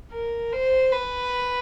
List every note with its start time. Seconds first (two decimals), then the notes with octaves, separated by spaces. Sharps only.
0.12 A#4
0.52 C5
0.92 B4